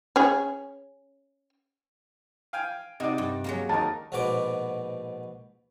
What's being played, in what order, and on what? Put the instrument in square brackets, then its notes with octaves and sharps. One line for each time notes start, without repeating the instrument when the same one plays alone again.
[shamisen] C#4 G#4
[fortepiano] F5 G5 G#5
[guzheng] C3 [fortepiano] D#4 F#4 D5
[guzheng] G2
F#3 G#3 A#3
[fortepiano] D#2 D#4 A#4 [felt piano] A5
[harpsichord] A#1 G#2 B2 B3 F#4 D6